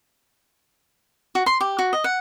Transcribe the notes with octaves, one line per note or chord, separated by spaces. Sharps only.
F#4
C6
G4
F#4
D#5
F#5